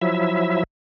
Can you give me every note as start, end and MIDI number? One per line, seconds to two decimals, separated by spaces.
0.01 0.63 53
0.01 0.63 54
0.01 0.63 64
0.01 0.63 76